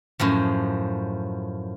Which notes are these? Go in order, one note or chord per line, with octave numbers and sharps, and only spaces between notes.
F#2 A2 F3